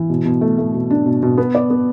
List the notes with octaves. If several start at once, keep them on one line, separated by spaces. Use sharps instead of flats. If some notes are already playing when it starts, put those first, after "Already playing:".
Already playing: E3
B2
B2
A3
A3
B2
D4
B2
B2
B3
D5
B3